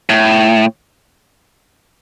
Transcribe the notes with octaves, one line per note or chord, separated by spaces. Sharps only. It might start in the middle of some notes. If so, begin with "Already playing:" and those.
A2